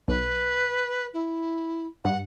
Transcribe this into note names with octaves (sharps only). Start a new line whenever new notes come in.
B1 B4
E4
G2 F#5